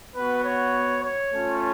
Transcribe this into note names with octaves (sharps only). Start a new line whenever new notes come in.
B3 F#4 B4
C#5
C#5
A3 C#4 F4